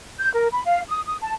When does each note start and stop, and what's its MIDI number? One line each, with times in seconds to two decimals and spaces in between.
0.19 0.32 91
0.34 0.48 70
0.51 0.62 83
0.66 0.81 77
0.89 1.01 87
1.06 1.17 87
1.21 1.33 81